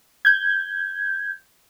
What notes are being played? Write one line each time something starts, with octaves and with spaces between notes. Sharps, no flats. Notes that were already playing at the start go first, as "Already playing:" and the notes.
G6 G#6